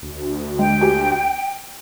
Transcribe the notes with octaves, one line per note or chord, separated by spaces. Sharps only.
D2
G#3 G5
G4 G#5